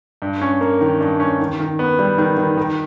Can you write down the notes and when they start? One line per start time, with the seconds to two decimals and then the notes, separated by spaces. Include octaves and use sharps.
0.22 G2
0.41 C#4
0.61 A#3
0.81 D#3
1.00 G2
1.20 C#4
1.40 D#3
1.60 D#3
1.79 B3
1.99 G3
2.18 D#3
2.38 D#3
2.57 D#3